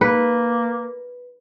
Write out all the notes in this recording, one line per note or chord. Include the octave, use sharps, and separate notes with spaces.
A#3 B4